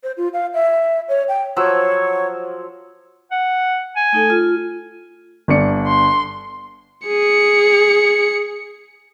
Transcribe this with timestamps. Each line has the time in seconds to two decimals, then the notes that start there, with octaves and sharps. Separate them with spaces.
0.03 C5
0.17 F4
0.33 F5
0.54 E5
1.08 C#5
1.29 G5
1.56 F3 F#3 C#5 E6
3.31 F#5
3.96 G#5
4.13 A3 D#4 A4
4.30 F4
5.48 G1 D4 C#7
5.87 C6
7.07 G#4 C#7